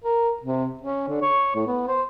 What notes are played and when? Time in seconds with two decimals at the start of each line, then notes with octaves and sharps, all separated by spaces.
0.04 A#4
0.43 C3
0.81 C#4
1.08 D3
1.22 C#5
1.55 A2
1.67 B3
1.88 C5